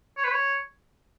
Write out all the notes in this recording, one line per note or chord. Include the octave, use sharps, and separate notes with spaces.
C#5
B4
C#5